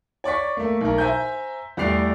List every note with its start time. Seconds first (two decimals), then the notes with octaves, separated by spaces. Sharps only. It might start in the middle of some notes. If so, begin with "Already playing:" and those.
0.24 C#5 D5 C#6 B6
0.57 A3 A#3
0.81 B1 A#4
0.98 C5 E5 G#5 A#5 G6
1.77 E2 G3 A3 D5 C7 F7